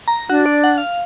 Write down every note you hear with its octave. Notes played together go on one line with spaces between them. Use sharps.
A#5
D4 F#4
D5
F#5
F5